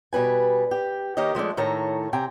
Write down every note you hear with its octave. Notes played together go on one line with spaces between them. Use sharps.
B2 G3 B4 G#5
G4
D#3 A#3 G4 C#5 D#5
F3 G#3 A3 D4
A2 D#3 A4 C#5 A#5
C3 G5 G#5 A#5